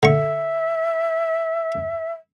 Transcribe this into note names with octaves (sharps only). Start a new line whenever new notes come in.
D3 E5 C#6